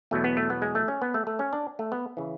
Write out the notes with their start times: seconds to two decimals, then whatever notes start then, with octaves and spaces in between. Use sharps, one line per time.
0.11 E2 B2 F#3 A3
0.24 B3
0.37 A3
0.50 B3
0.62 G#3
0.75 A3
0.88 C#4
1.02 B3
1.14 A3
1.27 A3
1.39 C#4
1.53 D4
1.79 A3
1.92 B3
2.17 C#3 E3